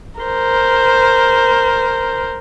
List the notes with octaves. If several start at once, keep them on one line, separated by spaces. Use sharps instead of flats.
A#4 C5